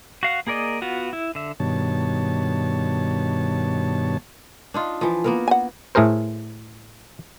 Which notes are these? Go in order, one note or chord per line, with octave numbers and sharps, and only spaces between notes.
F#4 F5 F#5
A#3 G#4 A#4 D5 D#5
B3 F4 F#4
E4
D3 E5
G2 B2 D#3 C#5 A5
D4 D#4 F4
E3 F3
A#3 B3 A#4
F#5 G#5
A2 A3 G#4 A#4 C5